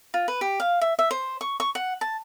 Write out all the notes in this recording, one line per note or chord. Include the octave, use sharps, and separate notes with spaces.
F4
B4
G4
F5
E5
E5
C5
C#6
C#6
F#5
A5